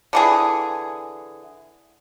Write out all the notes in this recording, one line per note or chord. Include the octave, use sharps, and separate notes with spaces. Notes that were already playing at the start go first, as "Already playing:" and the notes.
D3 E3 G#4